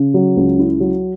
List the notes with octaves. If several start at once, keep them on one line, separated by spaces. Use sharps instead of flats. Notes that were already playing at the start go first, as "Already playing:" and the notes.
Already playing: C#3
F#3
C#2
E4
F#3